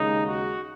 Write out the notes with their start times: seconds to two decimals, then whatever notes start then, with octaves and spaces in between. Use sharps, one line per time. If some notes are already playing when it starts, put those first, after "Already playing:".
Already playing: D#2 C#3 G#3 D#4
0.23 F#4